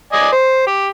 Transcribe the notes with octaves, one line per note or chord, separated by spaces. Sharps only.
D5 D#5 G#5
C5
G4